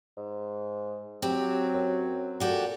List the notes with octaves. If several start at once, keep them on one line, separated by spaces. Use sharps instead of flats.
G#2
F#3 C4 G4
F#2
A#2 F#4 G4 A4